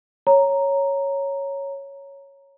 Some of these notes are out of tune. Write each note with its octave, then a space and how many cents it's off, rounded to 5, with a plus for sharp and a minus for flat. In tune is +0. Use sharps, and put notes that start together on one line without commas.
C#5 +0 A#5 +0